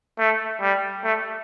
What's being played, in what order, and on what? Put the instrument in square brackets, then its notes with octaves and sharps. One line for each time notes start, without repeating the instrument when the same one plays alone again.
[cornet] A3
G3
A3